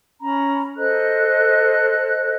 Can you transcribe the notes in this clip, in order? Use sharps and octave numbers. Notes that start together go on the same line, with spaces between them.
C#4 A#5 B5
A4 C5 D#5 F#6